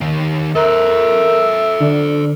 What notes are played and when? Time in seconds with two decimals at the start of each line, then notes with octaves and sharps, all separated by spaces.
0.01 D#3 G4
0.55 A4 A#4 C5 E5
1.80 D3 D4